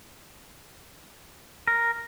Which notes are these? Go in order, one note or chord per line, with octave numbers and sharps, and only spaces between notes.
A#4